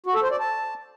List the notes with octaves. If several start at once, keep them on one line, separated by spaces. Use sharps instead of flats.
F#4
A4
C5
D5
A5